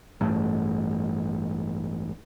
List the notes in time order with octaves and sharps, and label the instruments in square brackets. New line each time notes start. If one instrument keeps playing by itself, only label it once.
[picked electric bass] A1 G2 A3